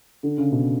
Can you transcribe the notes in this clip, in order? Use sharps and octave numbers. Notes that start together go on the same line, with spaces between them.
D3
C#3
B2